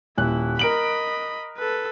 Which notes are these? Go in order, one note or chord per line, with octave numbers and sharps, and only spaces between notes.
D#1 E4 F#6
A#4 D#5 B5 D7 F#7
A4 B4